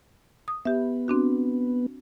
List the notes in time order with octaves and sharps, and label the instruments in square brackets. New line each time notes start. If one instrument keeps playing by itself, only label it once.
[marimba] D#6
[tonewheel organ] B3 [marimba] G4 E5
[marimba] C4 D4 F#4